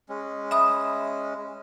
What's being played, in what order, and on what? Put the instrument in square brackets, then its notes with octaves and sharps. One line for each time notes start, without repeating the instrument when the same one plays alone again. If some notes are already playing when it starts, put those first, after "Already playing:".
[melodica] G#3 C#4
[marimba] E5 B5 D#6